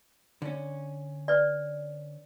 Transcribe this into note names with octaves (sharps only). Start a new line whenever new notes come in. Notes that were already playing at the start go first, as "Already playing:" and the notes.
D3 C#4
B4 D5